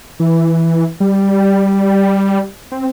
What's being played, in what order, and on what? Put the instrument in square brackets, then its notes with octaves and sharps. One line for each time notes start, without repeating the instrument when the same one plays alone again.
[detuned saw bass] E3
G3
C4